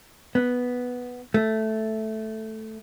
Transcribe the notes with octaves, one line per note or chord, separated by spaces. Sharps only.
B3
A3